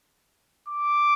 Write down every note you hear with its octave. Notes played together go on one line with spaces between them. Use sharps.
D6